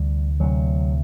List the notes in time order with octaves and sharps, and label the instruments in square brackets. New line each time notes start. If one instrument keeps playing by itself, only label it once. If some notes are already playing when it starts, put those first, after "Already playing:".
Already playing: [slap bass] D2 C3 G3
D2 C3 F#3